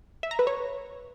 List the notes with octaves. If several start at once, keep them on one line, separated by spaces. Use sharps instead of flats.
E5
A#5
B4
C#5